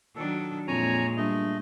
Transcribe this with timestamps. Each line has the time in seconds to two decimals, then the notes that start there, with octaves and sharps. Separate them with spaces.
0.16 D#3 F#3 D4 A4
0.67 F2 A#2 G#3 C#5 G#5 A#5
1.17 G2 A3 D#5